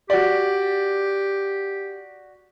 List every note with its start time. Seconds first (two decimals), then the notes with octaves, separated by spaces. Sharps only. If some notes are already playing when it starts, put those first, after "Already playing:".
0.10 F#4 G4 D5